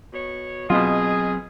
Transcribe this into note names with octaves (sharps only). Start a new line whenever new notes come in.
B2 C#5
B2 F#3 C4 F4 G#4 D#5